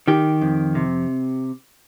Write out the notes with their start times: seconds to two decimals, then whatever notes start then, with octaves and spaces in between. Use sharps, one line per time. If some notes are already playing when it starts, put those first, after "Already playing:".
0.08 D#3 G4
0.41 F2
0.75 C3